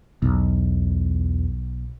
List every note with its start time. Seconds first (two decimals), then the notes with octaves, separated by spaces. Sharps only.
0.22 B1 E2